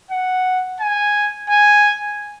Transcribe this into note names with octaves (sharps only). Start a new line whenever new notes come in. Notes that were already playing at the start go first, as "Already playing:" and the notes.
F#5
G#5
G#5